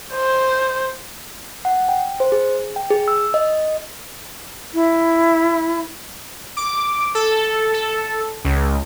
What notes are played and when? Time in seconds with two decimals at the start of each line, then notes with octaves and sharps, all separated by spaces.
0.14 C5
1.65 F#5
1.89 G5
2.20 C5
2.32 G#4
2.76 G5
2.91 G#4
3.08 E6
3.34 D#5
4.74 E4
6.57 D6
7.15 A4
7.74 A4
8.44 C#2